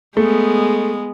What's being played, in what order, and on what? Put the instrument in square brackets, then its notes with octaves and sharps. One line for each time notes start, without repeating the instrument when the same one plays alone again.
[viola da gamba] G#3 B3 [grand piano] A3